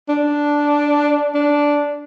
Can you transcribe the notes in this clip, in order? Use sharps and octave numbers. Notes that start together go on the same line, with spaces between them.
D4
D4